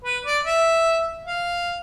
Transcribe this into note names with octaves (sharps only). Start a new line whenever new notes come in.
B4
D5
E5
F5